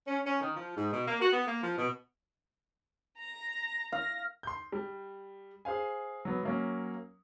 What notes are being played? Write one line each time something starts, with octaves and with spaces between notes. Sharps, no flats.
C#4
C#4
D#3
F3
G#2
B2
A#3
F#4
B3
A#3
F3
B2
A#5 A#6
F5 A#6
C6 G6
G3
G#4 C5 F5 G#5
F#3 B3
F#3 A#3 C#4